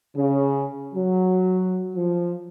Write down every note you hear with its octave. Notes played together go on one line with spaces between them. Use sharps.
C#3
F#3
F3